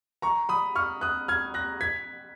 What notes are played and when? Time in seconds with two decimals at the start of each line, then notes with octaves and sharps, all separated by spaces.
0.22 A#5 C#6
0.49 B5 D#6
0.75 C#6 F6
1.01 D#6 F#6
1.28 F6 G#6
1.54 F#6 A#6
1.81 G#6 B6